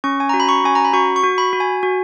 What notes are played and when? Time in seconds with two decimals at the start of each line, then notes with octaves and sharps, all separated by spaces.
0.04 C#4 C#6
0.20 G#5
0.29 F#4 A#5
0.40 B5
0.49 C#6
0.64 C#4 G#5
0.75 A#5
0.85 B5
0.93 F#4 C#6
1.16 C#6
1.24 F#4
1.38 B5
1.53 F#4
1.60 G#5
1.83 F#4